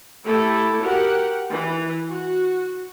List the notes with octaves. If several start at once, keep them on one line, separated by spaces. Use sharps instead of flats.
A3 E4 G4 A4
F#4 G4 A#4 F#5
E3
F#4